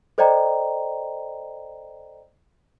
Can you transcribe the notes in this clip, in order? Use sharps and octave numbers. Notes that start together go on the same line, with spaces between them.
A4 C5 D5 D#5 G5 A#5